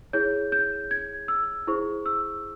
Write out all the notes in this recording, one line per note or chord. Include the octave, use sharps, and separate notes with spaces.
E4 G#4 C#5 G6
G6
G#6
E6
E4 G#4 C5 C#6
E6